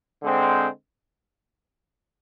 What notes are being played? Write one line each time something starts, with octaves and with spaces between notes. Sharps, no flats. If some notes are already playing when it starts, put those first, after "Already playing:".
D3 G#3 C4